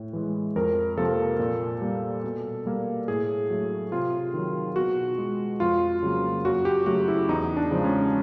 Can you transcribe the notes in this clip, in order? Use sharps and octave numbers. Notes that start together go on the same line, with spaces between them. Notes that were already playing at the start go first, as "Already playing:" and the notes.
Already playing: A2
E3 G#3
F2 A#4
C3 F3 A#3 A4
A#2
G3 A#3
B2
G3 A#3
A2 G#4
F#3 A3
C3 F4
D#3 F#3
B2 F#4
G#3
F2 F4
C#3 F#3 A#3
F#2 F#4
G4
C#3 F#3 A3 F#4
E4
E2 D#4
D4
C#3 F3 G#3
C#4